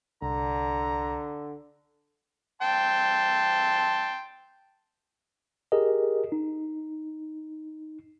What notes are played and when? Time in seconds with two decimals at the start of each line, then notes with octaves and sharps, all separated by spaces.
0.22 C2 D3 A#5
2.62 G5 A5 C6
5.72 G4 G#4 A#4 D#5
6.32 D#4